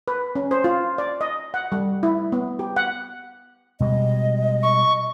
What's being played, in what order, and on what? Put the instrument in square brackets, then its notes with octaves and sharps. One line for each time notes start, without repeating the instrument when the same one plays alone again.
[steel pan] B4
C#4
C5
F4
D5
D#5
F#5
G3
E4
B3
G4
F#5
[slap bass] B2 G3 G#3 [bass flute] D#5
[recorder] C#6